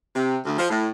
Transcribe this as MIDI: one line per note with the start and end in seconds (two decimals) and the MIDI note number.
0.15 0.39 48
0.46 0.54 38
0.59 0.69 53
0.71 0.90 45